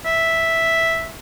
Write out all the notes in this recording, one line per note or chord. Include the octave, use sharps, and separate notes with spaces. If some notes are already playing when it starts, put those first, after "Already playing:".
E5